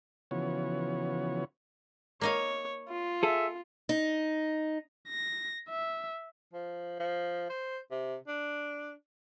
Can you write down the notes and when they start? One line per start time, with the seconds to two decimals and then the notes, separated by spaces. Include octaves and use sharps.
0.31 C#3 E3 F3 B3 F#4 C#5
2.21 A#3 D#4 C#5 F5
2.88 F4
3.23 G#4 A4 E5
3.89 D#4
5.08 A#6
5.69 E5
6.53 F3
6.99 F3
7.50 C5
7.91 C3
8.28 D4